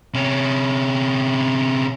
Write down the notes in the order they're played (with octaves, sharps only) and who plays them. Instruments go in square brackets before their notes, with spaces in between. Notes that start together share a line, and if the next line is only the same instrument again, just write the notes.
[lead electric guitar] C3 C#4